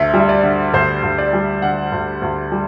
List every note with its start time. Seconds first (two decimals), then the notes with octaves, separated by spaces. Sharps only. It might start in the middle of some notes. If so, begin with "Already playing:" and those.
Already playing: D2 E5
0.14 G3
0.19 E5
0.29 D5
0.44 D3
0.74 D2 C5
1.03 D2
1.18 D5
1.33 G3
1.62 D3 F#5
1.92 D2
2.22 D2
2.52 G3